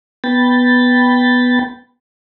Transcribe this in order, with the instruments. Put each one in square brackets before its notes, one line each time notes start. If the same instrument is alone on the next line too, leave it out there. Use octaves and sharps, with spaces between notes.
[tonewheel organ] B3 G5 B5 A6